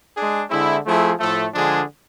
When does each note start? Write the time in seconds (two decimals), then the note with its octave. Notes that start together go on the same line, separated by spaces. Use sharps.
0.16 G#3 D4 G#4
0.50 D3 G#3 C4 E4
0.85 F3 A3 C4 E4 G#4
1.20 A2 F3 A3
1.54 D3 F3 G#3 D4 G#4